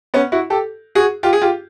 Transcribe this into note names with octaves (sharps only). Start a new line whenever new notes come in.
B3 C#4
E4 F#4
G4 A4
F#4 G#4
F4 G4
G#4
F4 G4